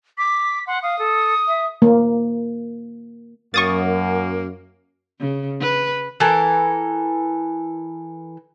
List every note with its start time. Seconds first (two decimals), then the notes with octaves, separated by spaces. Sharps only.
0.18 D6 B6
0.67 F#5 C6
0.82 F5 D#6
0.99 A4
1.47 E5
1.82 A#3
3.54 F#2 A#3 C#6 D#6 A6
5.20 C#3
5.61 B4
6.20 E3 A4 A#4